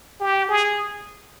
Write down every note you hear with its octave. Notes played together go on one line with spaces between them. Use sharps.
G4
G#4